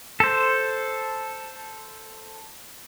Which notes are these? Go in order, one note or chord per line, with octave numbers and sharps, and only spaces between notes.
A4 C5